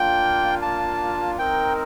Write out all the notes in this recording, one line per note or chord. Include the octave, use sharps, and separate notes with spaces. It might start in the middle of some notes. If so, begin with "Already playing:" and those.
Already playing: A#3 D4 F4 G5
A5
C4 D#4 A#4 G5